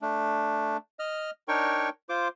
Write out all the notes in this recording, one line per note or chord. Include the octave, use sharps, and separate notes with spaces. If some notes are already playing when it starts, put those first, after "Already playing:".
A3 D4
D#5 F6
D4 D#4 A#4 C#5 G5 C#6
F4 C5 D6